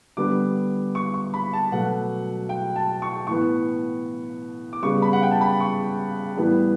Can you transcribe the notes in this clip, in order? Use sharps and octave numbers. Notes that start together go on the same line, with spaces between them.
D3 G3 B3 D6
C#6
C#6
B5
A5
B2 F#3 A3 F#5
G5
A5
C#6
A2 E3 B3 C#6
D6
C#3 G3 B3 C#6
B5
F#5
G5
A5
B5
C#6
A2 E3 G3 B3